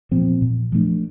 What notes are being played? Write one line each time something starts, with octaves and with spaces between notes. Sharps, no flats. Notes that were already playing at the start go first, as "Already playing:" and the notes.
A#2 F3 C4
A#2
F3 A3 D4